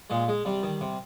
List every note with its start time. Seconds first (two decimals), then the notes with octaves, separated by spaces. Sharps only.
0.10 A#2 G#3
0.28 G#3
0.45 C3 G3
0.63 D#3
0.81 C3